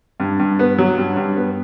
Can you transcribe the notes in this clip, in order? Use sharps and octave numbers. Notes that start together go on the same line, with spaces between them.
G2
G2
B3
F#3
G2
G2
B3